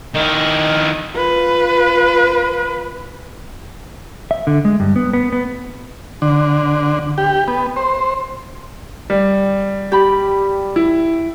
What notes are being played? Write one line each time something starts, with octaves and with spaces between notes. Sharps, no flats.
D#3 E4
F4 B4
E5
D3
G#3
G2
B3
B3
B3
D3
G4
B3
C5
G3
G4 B5
E4